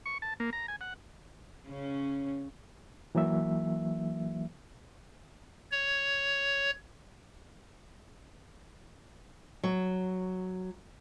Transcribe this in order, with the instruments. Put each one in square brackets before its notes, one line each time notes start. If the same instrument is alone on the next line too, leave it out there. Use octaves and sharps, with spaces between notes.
[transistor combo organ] C#6
A5
A#3
A#5
G#5
F#5
[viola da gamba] C#3 C#4
[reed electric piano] E3 F#3 A#3 E5
[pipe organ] C#5
[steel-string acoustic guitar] F#3